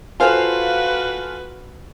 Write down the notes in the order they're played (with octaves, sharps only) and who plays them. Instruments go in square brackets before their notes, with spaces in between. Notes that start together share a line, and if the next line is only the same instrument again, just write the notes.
[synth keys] F4 F5 [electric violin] F#4 B4 [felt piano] A4 C5 G#5